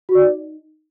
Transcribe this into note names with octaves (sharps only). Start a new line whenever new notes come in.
F#4
D5
D#4